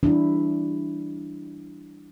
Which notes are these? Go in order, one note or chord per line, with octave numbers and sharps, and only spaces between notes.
E3 G3 D4 E4